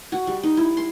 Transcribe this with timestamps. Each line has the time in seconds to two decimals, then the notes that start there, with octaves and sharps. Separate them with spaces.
0.12 F#4
0.27 G3
0.43 D#4
0.57 E4
0.77 C6